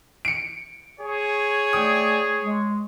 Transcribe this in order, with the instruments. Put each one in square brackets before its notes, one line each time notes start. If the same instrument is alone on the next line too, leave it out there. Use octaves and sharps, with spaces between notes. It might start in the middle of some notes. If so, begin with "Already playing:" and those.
[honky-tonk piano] C#7 D7
[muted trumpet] G#4 [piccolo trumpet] C#5
[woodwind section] A3 D5 G5 [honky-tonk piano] D#6
[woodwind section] G#3